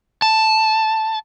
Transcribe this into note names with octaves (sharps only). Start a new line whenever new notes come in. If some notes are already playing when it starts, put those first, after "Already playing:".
A5